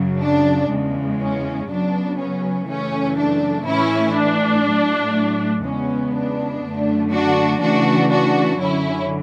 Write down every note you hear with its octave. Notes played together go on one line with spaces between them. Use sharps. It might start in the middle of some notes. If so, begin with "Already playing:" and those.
Already playing: F#2 C#3 F#3
D4
E2 C#3 G#3
C#4
F#2 C#3 F#3 B3 D4
C#4
F#2 C#3 E3 A3 C#4
D4
A2 E3 A3 C#4 E4
D4
A2 F#3 A3
E2 C#3 G#3 B3 C#4
D4
F#2 D3 A3
D4 F#4
C#3 E3 A3 D4 F#4
D4 F#4
F#2 D3 F#3 C#4 E4